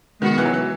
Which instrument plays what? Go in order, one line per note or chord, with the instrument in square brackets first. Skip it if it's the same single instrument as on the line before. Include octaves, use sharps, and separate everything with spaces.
[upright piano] D#3 [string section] G#3 B3 F#4
[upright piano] E3
F#3
E3